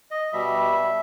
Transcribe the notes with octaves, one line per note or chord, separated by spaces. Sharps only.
D#5
B2 G3 E5